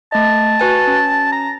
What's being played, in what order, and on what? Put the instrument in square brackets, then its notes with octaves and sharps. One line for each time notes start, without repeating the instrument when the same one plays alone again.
[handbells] A3 D#5 [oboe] A5
[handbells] F#4 B4 G#5
C#4
[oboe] A#5